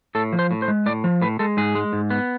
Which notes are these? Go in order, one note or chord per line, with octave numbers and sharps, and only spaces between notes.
A2 A4
F3
C5
A2
C5
G#3
A2 D5
F3
A2 B4
G#3 A4
G#2 G#4
G#3
G#2
B3